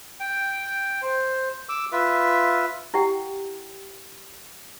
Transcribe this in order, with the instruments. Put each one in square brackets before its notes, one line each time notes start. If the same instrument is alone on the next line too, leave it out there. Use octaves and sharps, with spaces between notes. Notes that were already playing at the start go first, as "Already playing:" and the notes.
[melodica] G5
C5
D6 E6
F4 B4 E5
[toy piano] E4 G4 F#5 G5